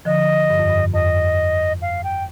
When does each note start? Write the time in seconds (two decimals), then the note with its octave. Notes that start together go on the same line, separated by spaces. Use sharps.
0.05 D3 F3 D#5
0.50 G2
0.59 F2
0.69 G2
0.94 F2 D#5
1.82 F5
2.04 G5